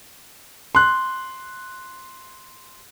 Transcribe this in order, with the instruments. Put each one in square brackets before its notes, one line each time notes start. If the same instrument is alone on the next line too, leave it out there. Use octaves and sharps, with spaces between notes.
[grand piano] C6 F#6